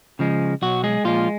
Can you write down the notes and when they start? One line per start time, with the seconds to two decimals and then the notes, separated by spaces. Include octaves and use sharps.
0.19 C#3 F3 G#3
0.62 B1 F#3 F#4
0.84 G#3 G#4
1.05 A#2 F3 G#3 F4